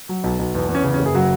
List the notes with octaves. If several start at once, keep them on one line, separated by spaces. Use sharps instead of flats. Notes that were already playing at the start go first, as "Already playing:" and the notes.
F#3
B1
B1
E2
E2
C#4
C#3
C#4
F#1
G#4
C#3 F#3 F#4